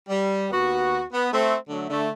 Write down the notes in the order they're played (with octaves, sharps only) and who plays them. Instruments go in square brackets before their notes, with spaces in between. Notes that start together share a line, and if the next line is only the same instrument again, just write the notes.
[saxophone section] G3
D#2 B3 F#4
B3
A3 C4
D3 F#3 A3
D3 A3